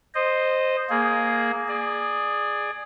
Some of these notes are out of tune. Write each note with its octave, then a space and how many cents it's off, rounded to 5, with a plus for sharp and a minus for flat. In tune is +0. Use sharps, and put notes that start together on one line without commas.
C5 +0 D#5 -15
A#3 +0 G#4 +10
G#4 +0 D5 +20